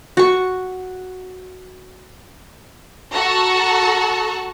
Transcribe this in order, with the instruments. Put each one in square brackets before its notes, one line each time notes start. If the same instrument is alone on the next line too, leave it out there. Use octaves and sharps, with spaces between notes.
[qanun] F#4 C#6
[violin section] F#4 A4 A5 A#5